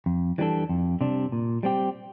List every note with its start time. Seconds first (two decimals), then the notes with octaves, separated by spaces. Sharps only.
0.06 F2
0.38 E3 G3 D4 A4
0.69 F2
1.01 C3 G3 D4
1.32 A#2
1.63 G3 C4 G4